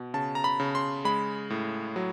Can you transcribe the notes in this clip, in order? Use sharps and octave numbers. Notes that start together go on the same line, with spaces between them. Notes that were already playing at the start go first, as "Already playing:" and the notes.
Already playing: B2
C#3 A5
A#5
B5
C#3
C6
G#3 B5
A2
F#3